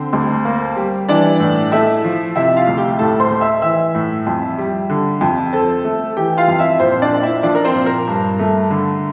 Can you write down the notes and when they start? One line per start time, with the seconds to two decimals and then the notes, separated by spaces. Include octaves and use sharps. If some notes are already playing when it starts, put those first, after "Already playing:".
Already playing: D3 C4 C5
0.13 D2
0.45 A#3
0.76 G3
1.08 E3 D4 D5
1.40 A2
1.72 A3 E4 E5
2.04 F3
2.36 C3 E4 E5
2.56 F4 F5
2.68 D2
2.78 G4 G5
2.99 A2 A4 A5
3.20 C5 C6
3.31 A3
3.41 E5 E6
3.62 E3 E5 E6
3.95 A2
4.27 F2
4.58 G3
4.90 D3
5.21 F2
5.53 C4 A4 A5
5.85 A3
6.17 E3 G4 G5
6.37 F4 F5
6.48 F2
6.59 E4 E5
6.80 A#2 C4 C5
7.02 D4 D5
7.13 A#3
7.23 E4 E5
7.43 F3 D4 D5
7.55 A#4
7.65 C4 C5
7.75 A#2
7.86 A#4
8.08 G2
8.39 A3
8.70 D3